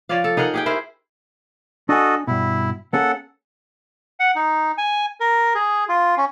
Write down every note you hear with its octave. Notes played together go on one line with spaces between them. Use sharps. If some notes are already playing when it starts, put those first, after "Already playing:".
F3 C#5 D5 F5
A4
D#4 G#4 A#4 F#5
G4 G#4 G5
E4 A#4 C5
D4 F#4 A4 D#5 G#5
G2 B2 E4
A#3 C#4 G#4 A4 F#5
F#5
D#4
G#5
A#4
G#4
F4
C#4